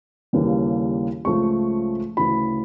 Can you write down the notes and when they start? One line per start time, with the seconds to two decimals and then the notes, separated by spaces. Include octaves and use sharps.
0.33 D#2 C#3 E3 G3 A#3
1.25 C#2 C#3 F3 A3 C#6
2.17 D2 C#3 E3 B5